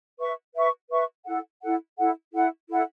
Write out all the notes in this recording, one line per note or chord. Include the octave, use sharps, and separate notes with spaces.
B4 E5 C#6
B4 E5 C#6
B4 E5 C#6
E4 A4 F#5
E4 A4 F#5
E4 A4 F#5
E4 A4 F#5
E4 A4 F#5